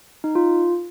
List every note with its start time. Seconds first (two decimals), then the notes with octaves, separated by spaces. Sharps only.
0.24 D#4
0.35 F4